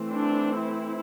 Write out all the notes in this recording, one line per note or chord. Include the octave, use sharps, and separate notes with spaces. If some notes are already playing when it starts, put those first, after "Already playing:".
Already playing: E3 A3 C4
D4
E4